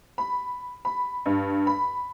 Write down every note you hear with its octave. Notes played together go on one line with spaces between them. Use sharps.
B5
B5
G2
B5